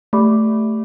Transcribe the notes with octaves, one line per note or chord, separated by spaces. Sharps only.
A3 G4 D5 B5 D6